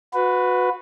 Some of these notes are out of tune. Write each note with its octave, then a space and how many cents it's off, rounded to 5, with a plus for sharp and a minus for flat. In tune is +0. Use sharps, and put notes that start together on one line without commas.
F#4 -20 B4 +10